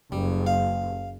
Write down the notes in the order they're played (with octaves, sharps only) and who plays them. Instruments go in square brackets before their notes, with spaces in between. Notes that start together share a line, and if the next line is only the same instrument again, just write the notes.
[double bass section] F#1 [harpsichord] G3
[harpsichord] F5